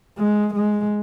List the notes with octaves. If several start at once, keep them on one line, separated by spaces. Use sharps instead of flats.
G#3
G#3